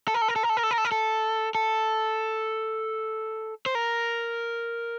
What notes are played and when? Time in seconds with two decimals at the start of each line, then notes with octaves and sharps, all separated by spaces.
0.08 A4
0.14 A#4
0.22 A4
0.28 A#4
0.36 A4
0.43 A#4
0.49 A4
0.57 A#4
0.63 A4
0.71 A#4
0.78 A4
0.85 A#4
0.92 A4
1.55 A4
3.66 C5
3.75 A#4